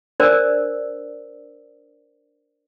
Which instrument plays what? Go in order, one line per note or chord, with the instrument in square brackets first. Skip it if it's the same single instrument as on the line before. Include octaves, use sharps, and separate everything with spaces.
[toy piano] D4 A#4 C5 D5 E6